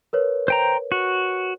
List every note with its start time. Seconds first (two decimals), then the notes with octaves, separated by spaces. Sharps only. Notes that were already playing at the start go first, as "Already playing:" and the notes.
0.13 A#4 B4 C#5
0.48 C5 G5 A#5
0.92 F#4